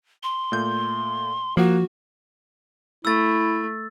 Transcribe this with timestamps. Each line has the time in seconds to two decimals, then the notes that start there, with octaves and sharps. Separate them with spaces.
0.23 C6
0.52 A#2 A3 G6
1.57 F3 A#3 F#4 F#5
3.05 A3 E4 E6 A6